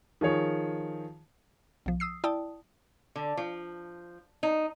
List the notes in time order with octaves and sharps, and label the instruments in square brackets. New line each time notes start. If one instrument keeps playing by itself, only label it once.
[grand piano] D#3 F3 G#4 C#5
[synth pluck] B1 F3
D#6 E6 C7
E4 D5 G5 A5 D#6
[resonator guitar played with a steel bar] D3
F3
D#4